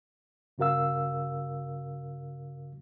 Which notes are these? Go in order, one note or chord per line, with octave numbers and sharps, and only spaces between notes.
G2 C#3 F#4 A#4 F5 E6